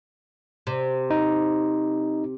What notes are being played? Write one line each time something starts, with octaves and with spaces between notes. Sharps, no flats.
C3
D#4